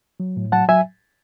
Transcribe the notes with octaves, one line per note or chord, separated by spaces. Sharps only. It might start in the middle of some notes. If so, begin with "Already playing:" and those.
F#3
A2
F#3 F#5 A5
F#3 E5 G#5